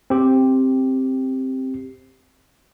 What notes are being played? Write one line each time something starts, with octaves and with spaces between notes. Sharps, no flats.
C4 G4